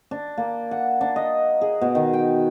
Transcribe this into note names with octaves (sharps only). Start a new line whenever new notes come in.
D4
A#3
F#5
D4
D#5
G#4
B2
D#3
G5